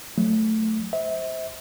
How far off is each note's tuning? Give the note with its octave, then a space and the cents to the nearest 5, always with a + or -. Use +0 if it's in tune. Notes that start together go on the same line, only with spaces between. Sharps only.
F#3 +0 A3 +0
C5 +0 E5 -30